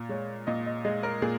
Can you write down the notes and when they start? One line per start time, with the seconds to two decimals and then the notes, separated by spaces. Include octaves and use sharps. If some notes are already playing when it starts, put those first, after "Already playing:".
Already playing: A#2
0.09 G#3 C#5
0.47 A#2 D#5
0.66 D#5
0.85 G#3 D#5
1.03 A#4
1.22 A#2 G#4